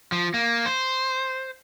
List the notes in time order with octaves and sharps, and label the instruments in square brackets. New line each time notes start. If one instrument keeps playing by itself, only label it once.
[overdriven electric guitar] F3
A#3
C5